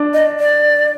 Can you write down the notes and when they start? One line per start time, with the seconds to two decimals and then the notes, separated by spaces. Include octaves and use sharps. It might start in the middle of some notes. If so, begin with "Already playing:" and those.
Already playing: D4
0.14 D#5
0.40 D5